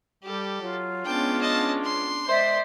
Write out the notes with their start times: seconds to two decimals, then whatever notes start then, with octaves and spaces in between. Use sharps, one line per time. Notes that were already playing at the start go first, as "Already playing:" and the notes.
0.24 G3 G4 A4
0.61 F#3 F4
1.05 G#3 B3 C#4 D4 G5 A5
1.41 D#5 A5
1.85 C6
2.29 G#3 C5 D5 E5